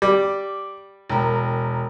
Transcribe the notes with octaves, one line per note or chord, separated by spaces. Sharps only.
G3 D6
E1 A#4